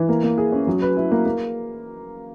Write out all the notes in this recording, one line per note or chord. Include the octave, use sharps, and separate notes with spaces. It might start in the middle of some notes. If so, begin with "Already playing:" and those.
Already playing: E3
A#3
A#3
G#4
C#4
F#3
B4
E4
A#3
A#3